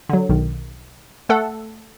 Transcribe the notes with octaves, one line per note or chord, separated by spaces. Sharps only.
D3 F#3
B1 D#3
A3 A4 F#5